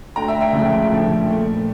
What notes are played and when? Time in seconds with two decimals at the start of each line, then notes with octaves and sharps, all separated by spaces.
0.16 D2 D3 A3 G5 A#5
0.28 E5 G5
0.41 E5 G5
0.53 C#2 C#3 F3 A3
0.90 G2 F3 A3
1.27 A#2 A3